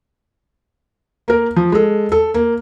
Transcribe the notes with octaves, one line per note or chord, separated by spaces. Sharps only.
A#3 A#4
F3
G#3 A4
A4
A#3